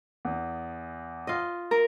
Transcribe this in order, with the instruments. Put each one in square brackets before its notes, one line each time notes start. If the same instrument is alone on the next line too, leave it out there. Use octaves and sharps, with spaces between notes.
[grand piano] E2
[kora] F4 D#5
[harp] A#4